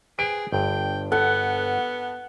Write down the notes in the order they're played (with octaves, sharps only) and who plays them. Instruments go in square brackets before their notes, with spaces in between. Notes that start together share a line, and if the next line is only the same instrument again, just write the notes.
[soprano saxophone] G#4 [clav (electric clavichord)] B4 C5 G5 [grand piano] D7
[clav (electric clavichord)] G1 G2 [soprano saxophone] G5
[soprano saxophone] B3 [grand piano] A4 [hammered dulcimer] F#5